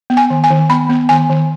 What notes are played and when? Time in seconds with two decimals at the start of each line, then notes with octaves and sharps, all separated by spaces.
0.10 B3
0.17 G#5
0.30 D#3
0.44 G#5
0.50 D#3
0.69 B3 B5
0.89 B3
1.09 D#3 G#5
1.29 D#3